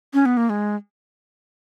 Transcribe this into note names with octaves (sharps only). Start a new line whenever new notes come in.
C#4
B3
A#3
G#3